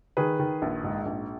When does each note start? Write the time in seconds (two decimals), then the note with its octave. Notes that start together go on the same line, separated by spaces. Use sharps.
0.17 D#3 G#4 B4
0.40 D#3
0.62 A#1
0.84 G#2
1.06 A#1